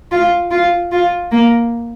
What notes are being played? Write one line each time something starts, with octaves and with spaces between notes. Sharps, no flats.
F4
F4
F4
A#3